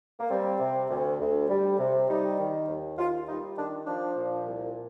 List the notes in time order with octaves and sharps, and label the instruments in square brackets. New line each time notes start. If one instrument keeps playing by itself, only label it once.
[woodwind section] A#3
G3 C4
C3
D2
D2
G3
C3
G3 D#4
D#3
D#2
D#2 F4
G3 D#4
D#3 D4
F3 D4
A#2
C2